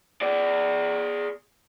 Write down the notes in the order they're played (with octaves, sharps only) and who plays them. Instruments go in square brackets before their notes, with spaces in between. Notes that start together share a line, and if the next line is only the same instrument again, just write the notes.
[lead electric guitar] G#4 D5